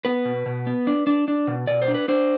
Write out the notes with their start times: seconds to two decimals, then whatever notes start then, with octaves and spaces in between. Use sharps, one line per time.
0.05 B3 B4
0.25 B2
0.46 B2
0.67 B3
0.87 D4
1.07 D4
1.28 D4
1.47 B2
1.67 B2 D5
1.82 C5
1.88 D4
1.94 B4
2.08 D4 C5